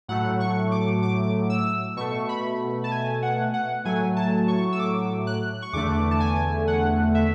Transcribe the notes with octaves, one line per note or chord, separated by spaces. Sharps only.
A2 F#3 A3 F#5
C#6
D6
D6
E6
B2 A3 C#6
B5
A5
G#5
F#5
F#5
A2 F#3 A3 G#5
A5
C#6
E6
D6
F#6
C#6
E2 D3 A3 D6
A5
G#5
F#5
E5